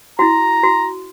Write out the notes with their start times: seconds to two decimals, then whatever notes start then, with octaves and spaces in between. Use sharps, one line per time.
0.19 E4 F#4 A#5
0.63 F#4